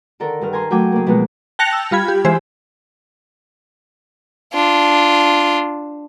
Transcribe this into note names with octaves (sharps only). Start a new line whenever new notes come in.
D3 D#3 A4 A#4
G2 D#3 F6
A#4 G#5 A#5 C6
F#3 A3 G5 G#5 D6
C#3 A#3
B2 F3 G#3 A#3 B3
G5 A5 F#6 A#6 C#7 F7
E6
G3 F4 B5 G#6
G4
E3 G#3 G#4 C5 E5
D4 F4